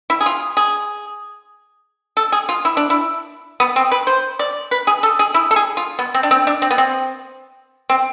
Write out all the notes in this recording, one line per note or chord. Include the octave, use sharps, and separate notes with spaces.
E4
G#4
F4
G#4
A4
G#4
F4
E4
D4
E4
B3
C4
B4
C5
D5
B4
G#4
A4
G#4
E4
A4
G#4
F4
B3
C4
D4
C4
D4
C4
B3
C4
C4